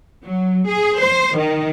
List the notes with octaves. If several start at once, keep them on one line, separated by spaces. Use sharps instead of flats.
F#3
G#4
C5
D#3